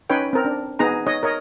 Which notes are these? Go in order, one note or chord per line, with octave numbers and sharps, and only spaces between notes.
C#4 D#4 B4 C#5 G5
C4 A#4
D4
B3 D#4 G#4 A#5
D#4 C#5 D#5
A#4 C#5 D#5